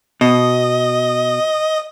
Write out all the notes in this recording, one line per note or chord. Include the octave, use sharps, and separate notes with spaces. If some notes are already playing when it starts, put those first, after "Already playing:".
B2 D#5